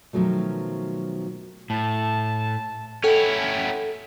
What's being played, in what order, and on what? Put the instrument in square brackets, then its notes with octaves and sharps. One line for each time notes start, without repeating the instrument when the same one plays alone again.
[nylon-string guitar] B2 D#3 F3 F#3 A3
[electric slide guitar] A2 [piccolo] A5
[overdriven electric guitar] C#4 E4 [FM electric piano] A4 F#5 G5